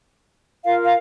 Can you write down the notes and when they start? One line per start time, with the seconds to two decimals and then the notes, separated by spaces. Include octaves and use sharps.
0.64 F4 A#4 F5
0.83 F5